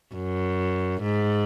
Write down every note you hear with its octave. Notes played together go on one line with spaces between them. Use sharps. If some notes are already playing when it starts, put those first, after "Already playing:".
F#2
G#2